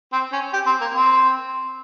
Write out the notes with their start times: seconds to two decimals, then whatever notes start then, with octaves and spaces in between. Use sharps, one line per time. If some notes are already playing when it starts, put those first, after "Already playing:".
0.13 C4
0.33 C#4
0.53 G4
0.66 C4
0.81 A#3
0.95 C4